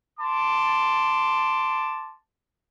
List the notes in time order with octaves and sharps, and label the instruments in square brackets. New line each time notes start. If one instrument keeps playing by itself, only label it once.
[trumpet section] A5 C6 D6